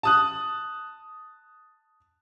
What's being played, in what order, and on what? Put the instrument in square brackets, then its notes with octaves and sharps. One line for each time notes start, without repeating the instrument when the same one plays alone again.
[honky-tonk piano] A5 D#6 F#6